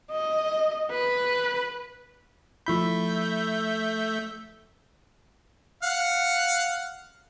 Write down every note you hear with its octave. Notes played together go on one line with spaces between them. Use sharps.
D#5
B4
F3 A3 E4 E5 B5 G6
F5 F#5